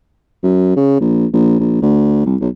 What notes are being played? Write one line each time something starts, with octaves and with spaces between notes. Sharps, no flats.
F#2
C#3
A#1
A#1
A#1
D2
C2
B1